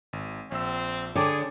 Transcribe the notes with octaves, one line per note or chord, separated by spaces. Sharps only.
G#1
A#1 C4 E6
D3 G#4 C#5 D5 G5 A5